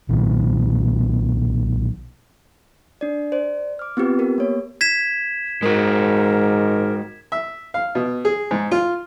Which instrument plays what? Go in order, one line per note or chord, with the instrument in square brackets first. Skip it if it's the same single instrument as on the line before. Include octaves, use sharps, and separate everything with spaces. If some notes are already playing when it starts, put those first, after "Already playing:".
[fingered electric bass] B1 A#2 D#3
[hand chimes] D4 D5
C5 D5
D6 F6
B3 C4 F4 G4 B4
B3 G4 A#4
A#3 C#5
[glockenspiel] G#6 B6 E7
[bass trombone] G#2 [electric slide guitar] G#3 F#4 [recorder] A#4
[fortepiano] E5
F5
B2
G#4
G#2
F4